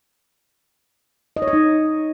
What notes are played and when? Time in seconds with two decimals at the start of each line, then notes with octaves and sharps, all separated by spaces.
1.37 D#5
1.42 C#5
1.48 D#5
1.53 D#4